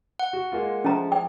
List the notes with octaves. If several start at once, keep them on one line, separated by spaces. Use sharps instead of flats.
F#5
F#4
G#3 A#3 F4
F3 G#3 A3 C#4 A#5
G5